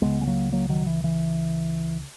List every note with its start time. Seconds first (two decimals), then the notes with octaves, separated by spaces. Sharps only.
0.01 C#2 C#3 G#3 B3
0.21 G#3
0.27 F#3 A#3
0.52 F#3 A#3
0.69 D#3 F#3
0.86 E3
1.04 E3